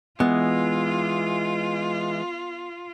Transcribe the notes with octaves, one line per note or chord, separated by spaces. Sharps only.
E3 G#3 B3 F4